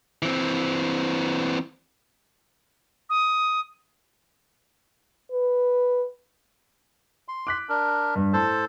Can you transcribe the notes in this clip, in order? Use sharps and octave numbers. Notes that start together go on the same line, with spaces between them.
E3 C4
D#6
B4
C6
D6 F#6 B6
D4 A#4
G2
A2 A4 C5 A5